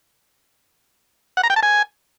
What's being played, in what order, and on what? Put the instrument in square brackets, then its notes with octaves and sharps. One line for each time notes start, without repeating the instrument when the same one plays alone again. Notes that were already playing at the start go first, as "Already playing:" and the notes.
[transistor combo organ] F#5
A#5
G5
A5
G#5